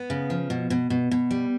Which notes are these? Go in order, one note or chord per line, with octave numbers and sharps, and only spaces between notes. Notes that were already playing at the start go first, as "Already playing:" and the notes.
Already playing: B3
C#3
F3
B2
B2
B2
B2
G3